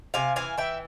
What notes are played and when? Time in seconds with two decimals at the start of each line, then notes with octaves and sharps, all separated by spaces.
0.14 C3 F5 G#5
0.36 E3 F5 G#5
0.58 E3 E5 G5